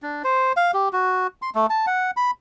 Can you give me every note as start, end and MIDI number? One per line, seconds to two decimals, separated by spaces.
0.02 0.22 62
0.24 0.52 72
0.57 0.71 77
0.74 0.89 67
0.93 1.27 66
1.42 1.50 84
1.55 1.66 57
1.70 1.86 81
1.87 2.11 78
2.17 2.31 83